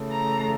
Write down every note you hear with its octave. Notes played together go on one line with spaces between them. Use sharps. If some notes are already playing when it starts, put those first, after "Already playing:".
Already playing: C#3 E3 A3
A#5